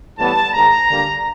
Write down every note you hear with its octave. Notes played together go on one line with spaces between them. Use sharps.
A2 E3 G3 B3 A5
G#2 D#3 G#3 A#5
D3 G3 A#3 D4